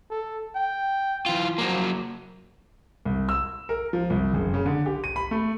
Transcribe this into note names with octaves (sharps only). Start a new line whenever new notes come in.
A4
G5
E3 F4
F3 F#3 A#3
C2
E6
A#4
F3
C2
F#1
C#3
D3
G4
D#7
B5
A3